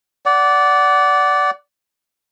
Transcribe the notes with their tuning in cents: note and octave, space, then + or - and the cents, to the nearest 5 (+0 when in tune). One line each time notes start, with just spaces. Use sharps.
D5 -15 F#5 +15